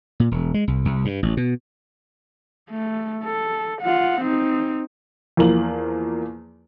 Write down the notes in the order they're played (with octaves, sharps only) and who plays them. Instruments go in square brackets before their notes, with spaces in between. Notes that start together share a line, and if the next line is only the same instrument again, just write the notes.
[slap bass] A#2
E1
G#3
C2
C2
G2
A1
B2
[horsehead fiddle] A3
A4
F4 F#5
C4 D#4
[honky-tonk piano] E2 F3 A#3 F#7